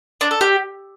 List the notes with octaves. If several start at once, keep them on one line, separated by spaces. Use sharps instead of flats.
D4
A4
G4